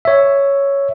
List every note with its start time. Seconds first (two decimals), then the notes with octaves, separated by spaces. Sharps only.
0.05 C#5 E5